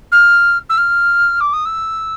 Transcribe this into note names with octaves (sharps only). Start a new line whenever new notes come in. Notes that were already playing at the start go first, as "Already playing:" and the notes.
F6
E6
F6
D6
D#6
E6